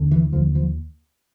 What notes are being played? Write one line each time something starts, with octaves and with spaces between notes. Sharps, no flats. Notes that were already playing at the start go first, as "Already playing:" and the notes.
Already playing: D#2 D3
E3
D#2 D3 F3
F3